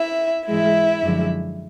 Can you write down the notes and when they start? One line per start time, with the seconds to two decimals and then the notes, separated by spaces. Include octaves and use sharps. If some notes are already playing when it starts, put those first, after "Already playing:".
Already playing: E4 E5
0.47 G#2 E3 G#3 E4 E5
1.02 F#2 D3 F3 G#3